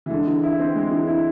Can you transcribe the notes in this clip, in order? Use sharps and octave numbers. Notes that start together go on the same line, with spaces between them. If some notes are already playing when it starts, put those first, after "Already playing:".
E3
D3 G#3
E3
E4
C4
G#3
E3
E4